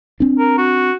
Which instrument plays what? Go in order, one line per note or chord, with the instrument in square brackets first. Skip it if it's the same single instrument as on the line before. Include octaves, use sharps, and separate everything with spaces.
[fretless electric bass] C4 D4
[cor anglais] A#4
F#4